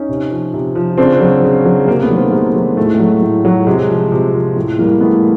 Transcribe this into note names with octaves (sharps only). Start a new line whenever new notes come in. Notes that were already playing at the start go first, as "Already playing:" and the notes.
Already playing: C#4 D#4
C3
F3
C3
F3
C#3 C4 D4
F#3
C#3
F#3
C3 G#3 A#3
A3 B3
D#3 F#3
A#3 C4
C3 G#3 A#3
D#3 F#3
A2 A3
G#3
A3
F#3
A2
F#3
C3 G#3
F3
C3
F3
A2 A3
E3 G3 G#3 A#3
A2 A3 B3